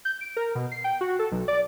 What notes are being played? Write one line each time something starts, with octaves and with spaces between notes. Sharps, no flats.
G6
D7
A#4
B2
C7
G5
F#4
A4
B1
D5